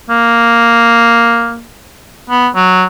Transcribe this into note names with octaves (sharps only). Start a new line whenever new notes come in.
A#3
B3
F#3